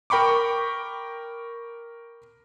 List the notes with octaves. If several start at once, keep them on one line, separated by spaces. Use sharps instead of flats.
A#4 G5 B5 C#6 D6